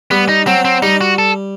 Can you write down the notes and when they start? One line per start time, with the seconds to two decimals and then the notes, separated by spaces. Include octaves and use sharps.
0.11 G3 B3
0.29 D#4
0.47 F#3 C4
0.65 C4
0.82 G3 D#4
1.01 F#4
1.18 A4